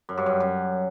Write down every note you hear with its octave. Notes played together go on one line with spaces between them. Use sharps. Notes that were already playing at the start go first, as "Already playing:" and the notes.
F#2
G2
F#2
F#2